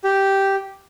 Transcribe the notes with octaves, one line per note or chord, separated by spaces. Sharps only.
G4